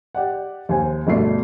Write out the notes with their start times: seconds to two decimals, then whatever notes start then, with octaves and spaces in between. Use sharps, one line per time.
0.15 G4 D5 F#5
0.69 D#2 C5 G#5
1.07 G1 B2 A3 D5 C7